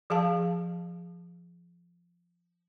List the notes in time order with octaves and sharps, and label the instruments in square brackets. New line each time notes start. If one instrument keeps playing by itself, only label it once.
[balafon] F3 G#4 F5 A5